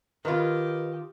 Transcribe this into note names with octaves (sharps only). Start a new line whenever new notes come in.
D#3 F4 G4 A#4 B4 D#5